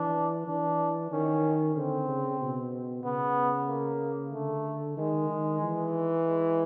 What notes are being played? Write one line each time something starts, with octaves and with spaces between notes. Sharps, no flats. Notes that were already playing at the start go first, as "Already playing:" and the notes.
Already playing: E3 D4
E3 D4
D#3 C#4
D3 C4
C#3
B2
C#3 B3
A#3
D3 A3
D#3 G#3
D#3
E3
G#3